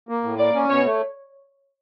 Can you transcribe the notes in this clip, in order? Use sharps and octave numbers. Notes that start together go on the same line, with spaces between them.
A#3
A2
A#3 D5
C#4
B2 C#5
A3